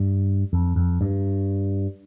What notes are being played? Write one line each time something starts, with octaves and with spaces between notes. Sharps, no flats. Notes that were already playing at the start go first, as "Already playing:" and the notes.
Already playing: G2
F2
F2
G2